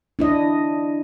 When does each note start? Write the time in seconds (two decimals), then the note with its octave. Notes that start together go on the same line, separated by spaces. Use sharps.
0.19 D4 E4 D#5